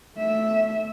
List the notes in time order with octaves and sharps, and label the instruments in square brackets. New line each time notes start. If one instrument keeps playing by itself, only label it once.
[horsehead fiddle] A3 E5